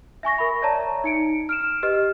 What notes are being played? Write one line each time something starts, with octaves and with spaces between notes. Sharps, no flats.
E5 G#5 C#6 A#6
A#4 B5
C#5 D5 E5 A5 A#5
D#4 C#7 D7
F6 D7 E7
G4 B4 D#5 F6